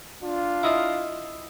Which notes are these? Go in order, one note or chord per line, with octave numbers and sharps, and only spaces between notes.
D4 F4
E4 D#5 F5